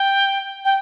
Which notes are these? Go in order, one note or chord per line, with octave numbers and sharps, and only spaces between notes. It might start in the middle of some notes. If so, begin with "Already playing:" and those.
Already playing: G5
G5